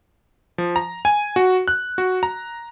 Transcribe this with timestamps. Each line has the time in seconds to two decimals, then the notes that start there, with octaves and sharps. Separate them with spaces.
0.58 F3
0.76 A#5
1.05 G#5
1.36 F#4
1.68 F#6
1.98 F#4
2.23 A#5